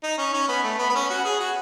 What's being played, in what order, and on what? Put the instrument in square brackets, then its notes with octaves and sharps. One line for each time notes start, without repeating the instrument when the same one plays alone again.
[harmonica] D#4
C#4
C#4
B3
A3
B3
B3
C#4
F#4
G#4
F#4